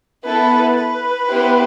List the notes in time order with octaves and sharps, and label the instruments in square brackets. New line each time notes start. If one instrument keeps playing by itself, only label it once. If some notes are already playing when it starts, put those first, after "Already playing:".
[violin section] B3 E4 A4 [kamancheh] B4
[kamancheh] B4
[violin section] B3 E4 G4 C5